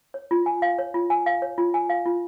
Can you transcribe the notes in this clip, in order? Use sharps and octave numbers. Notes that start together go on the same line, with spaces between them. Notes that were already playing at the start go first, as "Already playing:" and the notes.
C#5
F4
G#5
F5
C#5
F4
G#5
F5
C#5
F4
G#5
F5
F4